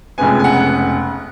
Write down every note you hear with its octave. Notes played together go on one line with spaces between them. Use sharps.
F1 F2 C#3 G#3 B3 G#5
G#5
F#5